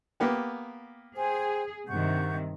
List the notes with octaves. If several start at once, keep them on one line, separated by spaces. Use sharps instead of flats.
A#3 B3 G4
G#4 C5 G5 G#5
G2 C3 D#3 F#5 C#6 G6